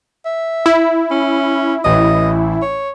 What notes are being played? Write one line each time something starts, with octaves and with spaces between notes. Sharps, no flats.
E5
E4 E6
C#4
A1 E3 D#5
C#5